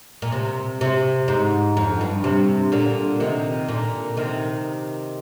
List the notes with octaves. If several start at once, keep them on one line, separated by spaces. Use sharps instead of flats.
A#2
C3
C3
G#2
F2
G2
C3
A#2 D3
C3 D#3
A#2 D3
C3 D#3